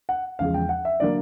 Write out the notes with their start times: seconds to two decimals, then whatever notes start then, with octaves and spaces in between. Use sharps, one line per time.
0.09 F#5
0.39 E2 C#3 F3 G#3 F5
0.54 G5
0.69 F#5
0.85 E5
1.00 D3 F#3 A#3 D5